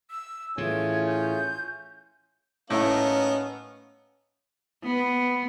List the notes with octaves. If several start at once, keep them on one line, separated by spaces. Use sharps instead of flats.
E6
A2 E3 A3 C#4 F4 G#4 G#6
G6
A2 A#3 B3 C#4 D#4
B3